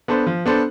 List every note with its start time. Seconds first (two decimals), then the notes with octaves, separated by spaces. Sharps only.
0.08 B3 D4 A4 C5
0.27 F3
0.46 B3 D4 A4 C5